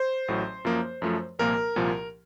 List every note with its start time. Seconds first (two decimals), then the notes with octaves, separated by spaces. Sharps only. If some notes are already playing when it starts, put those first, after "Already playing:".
Already playing: C5
0.28 A1 A2 F#3
0.65 F#2 F3 A#3
1.02 F#2 F3 A3
1.39 C2 A#2 F3 A#3 A#4
1.76 C2 A#2 F3